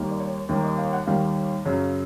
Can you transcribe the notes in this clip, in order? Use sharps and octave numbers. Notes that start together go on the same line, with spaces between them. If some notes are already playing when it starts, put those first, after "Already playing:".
Already playing: D#2 D#3 G3 A#3
D5
C#5
D#2 D#3 G3 A#3
D#5
F5
F#5
D#2 D#3 G3 A#3 F5
F#2 C#3 F#3